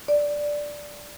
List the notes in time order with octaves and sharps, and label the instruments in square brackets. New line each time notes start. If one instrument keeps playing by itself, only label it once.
[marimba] D5